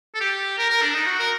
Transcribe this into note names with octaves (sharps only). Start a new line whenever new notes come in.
A4
G4
A#4
A#4
D4
D#4
F#4
A#4